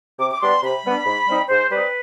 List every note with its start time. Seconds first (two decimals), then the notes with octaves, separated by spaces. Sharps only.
0.19 C3 D6
0.31 D6
0.41 G3 B3 D4 C6
0.62 C3 B5
0.84 G3 B3 D4
1.06 G#2
1.28 G3 C4 D#4
1.49 G#2 C5
1.71 G3 C4 D#4 B4